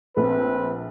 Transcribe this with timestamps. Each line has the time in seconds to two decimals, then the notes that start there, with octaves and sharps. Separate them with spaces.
0.17 A#1 C4 B4